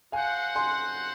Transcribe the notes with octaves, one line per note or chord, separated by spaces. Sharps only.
F#4 C5 F5 F#5 G#5
G#5 C6